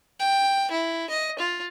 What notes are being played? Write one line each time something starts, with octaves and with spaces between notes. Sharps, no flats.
G5
E4
D#5
F4